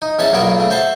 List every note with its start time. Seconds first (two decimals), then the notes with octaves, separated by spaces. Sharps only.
0.02 D#4
0.19 E2 C#4 E5 F#5 A5
0.33 B1 A#2 B3 F#4 A#4 C#5
0.58 C#3 A3
0.70 F#4 C5 E5 A5